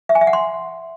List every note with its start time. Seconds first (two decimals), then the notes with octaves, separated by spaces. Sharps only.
0.09 E5
0.15 G#5
0.21 E5
0.27 F#5
0.33 C6